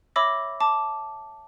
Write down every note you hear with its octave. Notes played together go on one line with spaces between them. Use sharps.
C#5 E5 B5 D6 E6 A#6
A5 D6